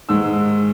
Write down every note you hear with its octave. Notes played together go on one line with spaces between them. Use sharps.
G#2 D#3 G#3 E6